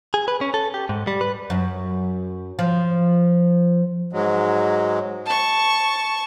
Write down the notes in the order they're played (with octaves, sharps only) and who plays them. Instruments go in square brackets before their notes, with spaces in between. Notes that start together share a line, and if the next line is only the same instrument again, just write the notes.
[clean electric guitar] G#4
B4
C#4
A4
G4
G#2
G3
B4
[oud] F#2
F3
[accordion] G#2 F#3 G#3
[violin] A5 C#6